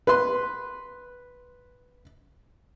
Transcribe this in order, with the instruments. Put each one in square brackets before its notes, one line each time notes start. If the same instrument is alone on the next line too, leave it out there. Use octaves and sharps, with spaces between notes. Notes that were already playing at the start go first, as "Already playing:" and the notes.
[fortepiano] B4 C6